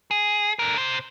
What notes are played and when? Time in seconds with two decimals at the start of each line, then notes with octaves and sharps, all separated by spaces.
0.11 G#4
0.59 D3 A#4
0.78 C3 C5